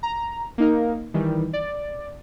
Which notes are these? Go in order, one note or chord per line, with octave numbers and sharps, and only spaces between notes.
A#5
A#3 D#4 A#4
D#3 E3 G3
D5